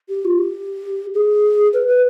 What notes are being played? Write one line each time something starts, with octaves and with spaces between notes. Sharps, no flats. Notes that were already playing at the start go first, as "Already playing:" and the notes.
G4
F4
G4
G#4
B4
B4